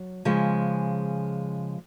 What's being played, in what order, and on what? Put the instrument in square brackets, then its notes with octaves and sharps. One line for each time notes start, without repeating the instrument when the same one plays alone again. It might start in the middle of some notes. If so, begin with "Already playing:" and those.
Already playing: [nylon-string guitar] F#3
C#3 F3 G#3